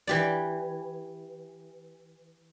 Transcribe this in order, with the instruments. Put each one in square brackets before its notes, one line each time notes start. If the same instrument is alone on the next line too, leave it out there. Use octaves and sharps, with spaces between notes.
[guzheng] E3 G4 D5